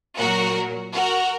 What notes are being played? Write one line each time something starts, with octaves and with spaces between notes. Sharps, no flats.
A#2 F#3 F#4 A#4
F#4 A#4